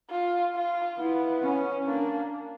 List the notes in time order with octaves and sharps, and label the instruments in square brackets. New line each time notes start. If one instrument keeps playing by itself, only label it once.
[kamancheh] F4
F4
[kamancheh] B3 [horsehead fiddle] E4
[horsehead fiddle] C#4
[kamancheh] A#3 [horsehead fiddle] D4